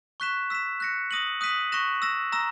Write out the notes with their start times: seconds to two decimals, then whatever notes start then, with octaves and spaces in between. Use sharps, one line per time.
0.20 C#6 F#6 B6 E7
0.50 E6 B6 E7
0.80 F#6 A#6 C#7
1.11 D#6 A#6 D#7 F#7
1.41 D#6 F#6 B6 D#7 F#7
1.72 C#6 F#6 A#6 E7
2.02 E6 A#6 E7
2.32 A#5 E6 A#6 E7